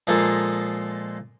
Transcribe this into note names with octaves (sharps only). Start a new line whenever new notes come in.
A#2 F3 G#3 A#3 G#4 A4